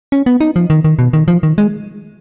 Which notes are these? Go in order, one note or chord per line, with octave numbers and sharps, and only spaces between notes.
C#4
B3
D#4
F3
D#3
D#3
B2
D#3
F3
D#3
G#3